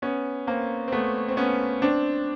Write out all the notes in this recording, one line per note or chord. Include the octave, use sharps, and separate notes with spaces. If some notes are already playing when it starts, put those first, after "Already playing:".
B3 C#4
A#3 C4
C4
A3 B3
C4
B3 C#4
C4 D4